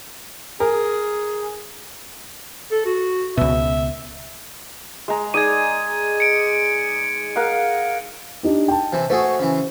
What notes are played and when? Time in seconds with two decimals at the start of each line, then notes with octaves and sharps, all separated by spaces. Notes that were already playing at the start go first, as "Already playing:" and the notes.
0.60 G#4 A#4
2.71 A4
2.86 F#4
3.37 C#2 B2 E5
5.08 G#3 A#5
5.34 D#4 G#4 D5 G#6 D#7
6.20 C#7 D7
7.36 A#4 F5 F#5
8.43 D4 D#4 G4
8.68 G5 A5
8.92 C3 E3
9.10 A3 F#4 G#4 C5
9.39 C#3 E3